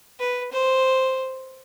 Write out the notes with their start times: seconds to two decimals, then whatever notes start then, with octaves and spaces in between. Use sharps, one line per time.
0.19 B4
0.52 C5